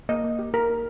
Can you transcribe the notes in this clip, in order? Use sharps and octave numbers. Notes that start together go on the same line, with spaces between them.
A#3 D#5
A#3
G4
A#3 A#4
A#3